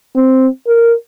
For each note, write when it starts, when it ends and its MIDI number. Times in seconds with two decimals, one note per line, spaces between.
0.16 0.48 60
0.67 0.93 70